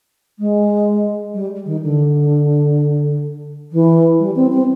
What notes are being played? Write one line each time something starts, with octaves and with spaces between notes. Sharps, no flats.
G#3
G3
D#3
D3
E3
G3
C4
C4